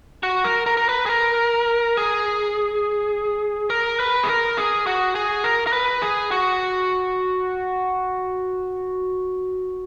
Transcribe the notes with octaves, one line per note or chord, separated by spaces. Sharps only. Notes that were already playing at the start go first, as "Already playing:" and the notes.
F#4
A#4
A#4
A#4
B4
G#4
A#4
G#4
A#4
B4
G#4
A#4
G#4
F#4
G#4
A#4
A#4
B4
G#4
F#4